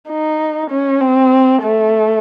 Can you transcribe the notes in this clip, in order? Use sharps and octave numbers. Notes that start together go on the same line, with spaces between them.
D#4
C#4
C4
A3